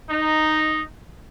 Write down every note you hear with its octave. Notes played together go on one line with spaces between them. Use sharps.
D#4